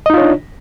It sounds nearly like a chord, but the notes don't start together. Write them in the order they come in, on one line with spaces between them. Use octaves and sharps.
D#5 D#4 F4 C#5 D4